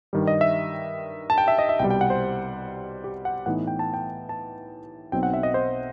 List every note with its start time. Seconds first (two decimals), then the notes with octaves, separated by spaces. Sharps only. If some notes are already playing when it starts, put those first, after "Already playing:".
0.13 G2 D#3 G3
0.27 D#5
0.41 E5
1.30 A5
1.38 G5
1.48 E5
1.59 D#5
1.69 E5
1.79 C2 B2 G3 G5
1.91 G5
2.01 F#5
2.10 C5
3.04 G4
3.25 F#5
3.46 A2 E3 B3 D#4 F#5
3.67 G5
3.79 A5
3.94 G5
4.29 A5
5.12 B1 B2 F#3 C4 D#4 G5
5.23 F#5
5.34 E5
5.43 D#5
5.54 C5